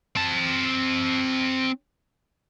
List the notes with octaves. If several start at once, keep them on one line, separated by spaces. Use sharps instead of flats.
C4 A5